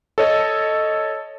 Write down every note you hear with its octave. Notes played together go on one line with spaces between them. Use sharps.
A4 C#5 D#5